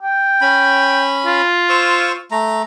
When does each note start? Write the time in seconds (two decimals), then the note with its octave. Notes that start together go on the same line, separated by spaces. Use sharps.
0.02 G5
0.41 C#4 B5
1.27 F4
1.69 C5 C#6 E6
2.31 A3 A#5